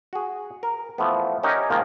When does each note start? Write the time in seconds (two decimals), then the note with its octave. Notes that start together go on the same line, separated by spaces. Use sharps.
0.13 F#4 G#4
0.63 A#4
0.98 E3 F3 A3 B3
1.43 C#4 D#4 G4 A#4 F#5 G#5
1.70 G#2 D#3 F3 A#3